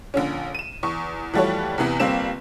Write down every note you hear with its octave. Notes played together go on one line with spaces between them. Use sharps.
A#1 D3 C#4
D#7 E7
E2 C#6
E3 F3 G3 A3 F#4 C#5
E2 C3 E3 B3
G1 G3 A#3 C4 E7